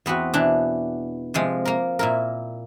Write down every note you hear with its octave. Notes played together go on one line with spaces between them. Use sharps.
E2 B3 C4 F#4
B2 E3 D4
C3 F3 G#3
A#3 A#4
A#2 E4 A#4